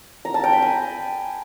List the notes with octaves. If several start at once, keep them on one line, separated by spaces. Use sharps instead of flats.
A#5
A5
G5
B5
G#5